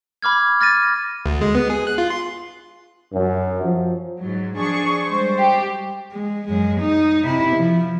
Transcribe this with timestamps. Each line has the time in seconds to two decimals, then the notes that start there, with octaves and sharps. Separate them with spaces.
0.22 B5 D6 F6 G#6
0.61 F6 A6 A#6 D#7
1.26 D2
1.41 G#3
1.55 B3
1.70 G#4
1.87 F#6
1.98 F4
2.10 C6
3.13 F#2
3.64 F3
4.19 G#2 F#3
4.58 F3 D4 G#4 C#6
5.08 G3 G#3 C5
5.38 G4
6.12 G#3
6.48 F#2 G#3
6.81 D#4
7.24 C3 E4
7.56 F3